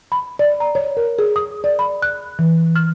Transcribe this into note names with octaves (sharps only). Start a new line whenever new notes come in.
B5
D5
A#5
C#5
A#4
G#4
D#6
D5
B5
F#6
E3
F6